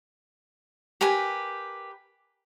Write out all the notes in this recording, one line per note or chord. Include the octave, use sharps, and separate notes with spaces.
G4 A#4 B4 G#5